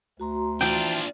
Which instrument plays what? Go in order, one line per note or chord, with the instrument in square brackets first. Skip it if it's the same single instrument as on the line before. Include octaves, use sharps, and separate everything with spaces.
[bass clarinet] D2 [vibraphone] F#4 A#5 C6
[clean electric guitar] E3 F3 G5 [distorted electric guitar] D4 F4